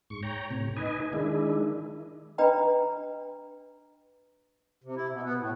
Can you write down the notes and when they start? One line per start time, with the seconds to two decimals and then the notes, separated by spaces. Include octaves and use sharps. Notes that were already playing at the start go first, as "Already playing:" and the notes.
0.10 G#2 C#6
0.23 C#5 G5 A#5
0.51 A2 C3
0.77 D#4 B4 D#5 G#5
1.13 D#3 G#3 D4 E4
2.38 D4 B4 D#5 G5 A#5 B5
4.84 C3
4.96 E4
5.11 B2
5.24 B3
5.37 A2